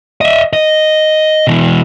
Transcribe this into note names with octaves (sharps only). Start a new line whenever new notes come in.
D#5 E5
D#5
B2 E3